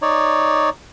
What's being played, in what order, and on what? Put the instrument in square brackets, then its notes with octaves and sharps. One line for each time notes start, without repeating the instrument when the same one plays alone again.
[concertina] D#4 C#5 D5